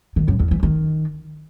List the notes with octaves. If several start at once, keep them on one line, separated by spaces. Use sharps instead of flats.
D#3
F#2
E2
E3
D#3